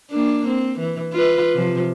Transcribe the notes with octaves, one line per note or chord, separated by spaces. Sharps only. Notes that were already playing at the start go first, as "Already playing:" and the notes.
A#3 D4
C4
E3
F4 B4
C3 F3